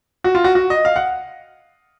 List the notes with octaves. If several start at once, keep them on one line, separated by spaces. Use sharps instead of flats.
F#4
F4
F#4
F#4
D#5
F5
F#5